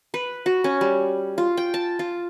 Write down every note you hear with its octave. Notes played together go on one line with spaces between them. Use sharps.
B4
F#4
C#4
G3
F4
G5
A5
F4